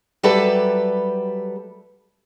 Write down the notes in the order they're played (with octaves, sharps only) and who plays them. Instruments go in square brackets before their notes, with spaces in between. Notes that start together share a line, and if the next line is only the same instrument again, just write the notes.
[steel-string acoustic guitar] F#3 G3 G4 A4 B4 E5